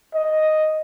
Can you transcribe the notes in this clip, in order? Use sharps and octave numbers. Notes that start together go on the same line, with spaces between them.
D#5